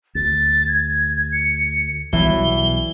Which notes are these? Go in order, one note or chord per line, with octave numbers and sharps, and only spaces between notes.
D2 A6
G#6
C#7
B1 B2 E3 G3 G7